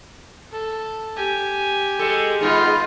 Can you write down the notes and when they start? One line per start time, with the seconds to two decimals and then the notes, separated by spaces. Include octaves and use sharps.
0.52 A4
1.16 G4 G#5
1.99 G#3 A4
2.41 G#3 B3 D#4 F4